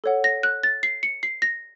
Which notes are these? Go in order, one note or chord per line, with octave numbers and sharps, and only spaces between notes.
A4 C#5 F#5
A#6
F#6
A6
C7
C#7
C7
A#6